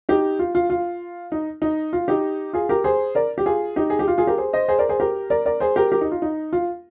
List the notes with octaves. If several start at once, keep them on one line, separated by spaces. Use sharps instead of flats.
D#4 G4
F4
F4
F4
D#4
D#4
F4
D#4 G4
F4 G#4
G4 A#4
G#4 C5
A#4 D5
G4
F4 G#4
D#4 G4
G#4
G4
F4
F4 G#4
G4 A#4
G#4 C5
C5 D#5
G#4 C5
A#4 D5
G#4 C5
G4 A#4
A#4 D5
A#4 D5
G#4 C5
G4 A#4
G4 A#4
D#4
F4
D#4
F4